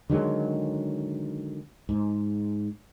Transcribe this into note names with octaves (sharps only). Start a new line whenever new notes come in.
D3 D#3 F#3 G#3
G#2